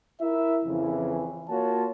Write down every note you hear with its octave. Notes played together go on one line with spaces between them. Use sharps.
E4 A#4 E5
F2 C#3 E3
A#3 F4 F#4 C#5 A5